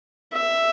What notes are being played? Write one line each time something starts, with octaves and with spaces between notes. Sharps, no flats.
E5